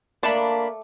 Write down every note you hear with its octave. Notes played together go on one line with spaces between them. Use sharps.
A3 A#3 D4 D5 A5 B5